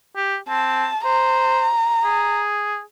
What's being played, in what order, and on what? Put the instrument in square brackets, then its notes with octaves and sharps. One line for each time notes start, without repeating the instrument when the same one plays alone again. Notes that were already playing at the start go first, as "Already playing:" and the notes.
[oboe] G4
[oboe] C4 [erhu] A5
[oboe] C5 [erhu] A#5
[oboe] G#4